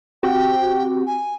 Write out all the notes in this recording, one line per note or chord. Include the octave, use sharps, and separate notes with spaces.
C4 F#4 G4 G5
G#5